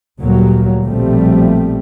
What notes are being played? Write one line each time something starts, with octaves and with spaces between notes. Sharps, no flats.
D2 A#2 F#3 G3 A#3
A#1 B2 F3 G3 A3 C4